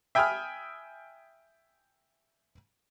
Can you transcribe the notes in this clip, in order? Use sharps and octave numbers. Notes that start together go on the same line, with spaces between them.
E5 G5 G#5 B5 D#6 F6